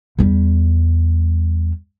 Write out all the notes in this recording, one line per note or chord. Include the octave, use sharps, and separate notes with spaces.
E2 G3